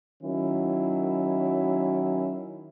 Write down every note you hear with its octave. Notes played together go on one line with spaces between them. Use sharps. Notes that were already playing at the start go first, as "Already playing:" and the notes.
D#3 F#3 C#4 E4